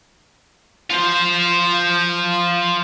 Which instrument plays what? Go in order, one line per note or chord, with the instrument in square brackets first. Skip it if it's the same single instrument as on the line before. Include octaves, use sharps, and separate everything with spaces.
[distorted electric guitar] F4 C5